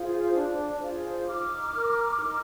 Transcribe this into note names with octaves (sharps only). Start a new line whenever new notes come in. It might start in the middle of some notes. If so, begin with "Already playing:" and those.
Already playing: F4 G#4 C5
D4
F4 G#4 C5
D#4 D6 F6
A#4
D#4